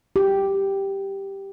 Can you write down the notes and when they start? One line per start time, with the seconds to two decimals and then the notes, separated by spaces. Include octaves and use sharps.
0.16 G4